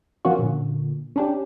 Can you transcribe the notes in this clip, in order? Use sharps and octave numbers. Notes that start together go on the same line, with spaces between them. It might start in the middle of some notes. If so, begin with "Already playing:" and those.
F3 A#3 C#4 F4 F#4
A#2 D3
C#4 D4 G4